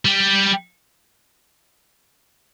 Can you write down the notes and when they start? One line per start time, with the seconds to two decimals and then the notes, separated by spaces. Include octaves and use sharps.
0.05 G3